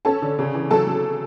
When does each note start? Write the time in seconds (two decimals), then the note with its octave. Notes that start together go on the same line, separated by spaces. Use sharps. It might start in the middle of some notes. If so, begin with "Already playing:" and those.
0.05 C#4 A4 A5
0.22 D3
0.39 C#3
0.55 E3
0.71 F#3 A4 A5
0.87 F#3